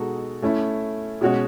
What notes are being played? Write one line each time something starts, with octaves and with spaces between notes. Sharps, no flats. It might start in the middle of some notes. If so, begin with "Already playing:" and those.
Already playing: B2 G#3 D#4 F#4 A4
A3 C#4 E4 A4
B2 G#3 C#4 F#4 C#5